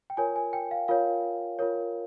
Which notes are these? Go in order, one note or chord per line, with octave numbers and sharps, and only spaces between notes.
G5
F4 A#4 C#5 G#5
G#5
G5
F5
F4 A#4 C#5 F5
F4 A#4 C#5